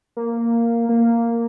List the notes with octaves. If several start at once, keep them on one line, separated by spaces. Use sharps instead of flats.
A#3
A#3